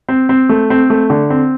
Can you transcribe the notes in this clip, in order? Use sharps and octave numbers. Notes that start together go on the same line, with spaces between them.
C4
C4
A3
C4
A3
D3
C4